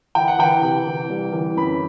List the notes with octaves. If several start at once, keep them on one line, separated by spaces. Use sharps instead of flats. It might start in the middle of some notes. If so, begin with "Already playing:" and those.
E3 G5
F#5
E3 G5
C3
E3
C2
E3
F#2 B5